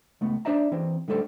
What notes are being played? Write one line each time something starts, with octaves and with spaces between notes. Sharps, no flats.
C#2 A3 B3
D4 C5 D5 E5 A#5
E3 C4
D3 G3 A3 A4 C5